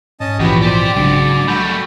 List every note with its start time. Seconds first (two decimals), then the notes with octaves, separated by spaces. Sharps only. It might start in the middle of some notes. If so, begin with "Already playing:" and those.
0.20 G#2 C#4 D#5 A5
0.39 A#1 E2 E3 F3 B3 F#4 G4
0.61 G4 C5 D5
0.96 A#1 G#2 C#3 F#3 D4
1.47 G3 A3 F#4 B5 G6